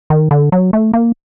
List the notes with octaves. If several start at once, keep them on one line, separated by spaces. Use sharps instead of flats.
D#3
D3
F#3
A3
A#3